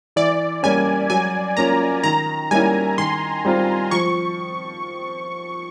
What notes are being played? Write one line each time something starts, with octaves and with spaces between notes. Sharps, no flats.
E3 D5
G3 A#3 C#4 G#5
F#3 G#5
A#3 C#4 F4 A#5
D#3 A#5
G3 A#3 C#4 E4 G#5
D#3 C6
G3 C4 F4
F3 C#6